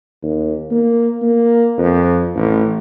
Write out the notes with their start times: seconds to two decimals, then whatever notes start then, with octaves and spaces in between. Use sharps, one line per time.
0.23 D#2
0.71 A#3
1.22 A#3
1.77 F2
2.35 A1